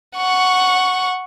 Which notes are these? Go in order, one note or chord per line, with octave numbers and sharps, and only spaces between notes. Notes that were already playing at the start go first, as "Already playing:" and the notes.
F#5 C#6